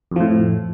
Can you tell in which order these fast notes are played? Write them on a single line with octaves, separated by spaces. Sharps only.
F2 F3 A2